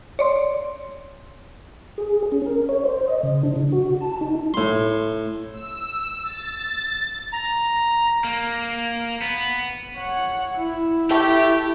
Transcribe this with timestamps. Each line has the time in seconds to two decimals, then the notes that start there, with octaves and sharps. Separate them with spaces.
0.19 C#5 D5 C6
1.98 G#4
2.32 C#4
2.46 A#4
2.69 C#5
2.85 C5
3.08 D#5
3.23 C#3
3.43 D4
3.56 C#3
3.72 F#4
4.01 A5
4.21 D#4
4.54 A2 C6
5.51 E6
6.24 A6
7.33 A#5
8.24 A#3
9.22 B3
9.96 C#5 F#5
10.55 E4
11.10 A3 G4 G5